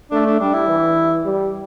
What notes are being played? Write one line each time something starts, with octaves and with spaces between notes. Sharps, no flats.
A3 D4
D4
G3 D4
E4
E3
G3